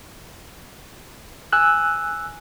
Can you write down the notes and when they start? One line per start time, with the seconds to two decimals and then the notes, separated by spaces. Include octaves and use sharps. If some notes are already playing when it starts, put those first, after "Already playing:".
1.53 G#5 E6 F#6